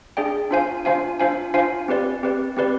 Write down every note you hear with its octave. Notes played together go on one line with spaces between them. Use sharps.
D4 G#4 D5 G5
D4 F4 C5 F5 G#5
D4 F4 C5 F5 G#5
D4 F4 C5 F5 G#5
D4 F4 C5 F5 G#5
C4 G4 B4 D5
C4 G4 B4 D5
C4 G4 B4 D5